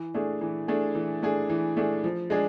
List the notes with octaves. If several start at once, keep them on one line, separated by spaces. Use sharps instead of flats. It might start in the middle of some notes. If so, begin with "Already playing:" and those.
Already playing: E3
A3 D4 G#4
E3
A3 D4 G#4
E3
A3 D4 G#4
E3
A3 D4 G#4
F3
G#3 D4 G#4